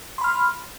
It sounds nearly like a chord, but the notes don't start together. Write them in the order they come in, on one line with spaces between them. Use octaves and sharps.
C6 B5 F6